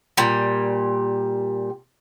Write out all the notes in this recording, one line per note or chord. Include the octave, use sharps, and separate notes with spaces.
A#2 G3